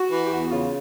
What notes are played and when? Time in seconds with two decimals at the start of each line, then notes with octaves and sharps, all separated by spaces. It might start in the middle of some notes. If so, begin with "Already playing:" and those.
Already playing: F#4
0.11 E3
0.24 G4
0.31 E2 F#4
0.51 C#3 F4